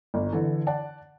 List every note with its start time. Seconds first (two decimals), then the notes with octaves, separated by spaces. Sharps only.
0.14 G1
0.32 D3 E3 A4
0.67 D5 F#5 A5